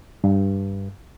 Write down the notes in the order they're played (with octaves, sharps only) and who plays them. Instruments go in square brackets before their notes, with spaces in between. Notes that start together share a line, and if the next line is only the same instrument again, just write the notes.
[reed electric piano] G2